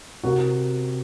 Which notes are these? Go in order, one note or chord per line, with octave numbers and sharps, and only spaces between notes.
C3 F#4 A#4